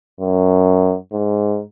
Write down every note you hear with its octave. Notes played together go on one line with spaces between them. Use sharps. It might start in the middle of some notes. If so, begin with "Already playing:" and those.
F#2
G#2